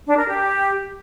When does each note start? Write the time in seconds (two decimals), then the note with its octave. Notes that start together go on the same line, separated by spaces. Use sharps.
0.07 D4
0.17 A#4
0.28 G4